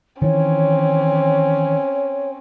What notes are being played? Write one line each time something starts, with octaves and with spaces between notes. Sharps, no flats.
D#3 E3 C4 C#4 C#5